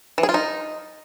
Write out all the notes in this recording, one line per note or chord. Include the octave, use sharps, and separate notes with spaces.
E3
G#4
F4
D#4